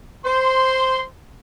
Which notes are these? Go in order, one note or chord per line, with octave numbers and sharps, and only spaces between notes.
C5 C6